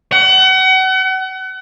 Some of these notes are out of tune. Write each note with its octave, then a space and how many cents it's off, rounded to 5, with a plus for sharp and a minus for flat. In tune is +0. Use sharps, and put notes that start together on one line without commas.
F#5 +35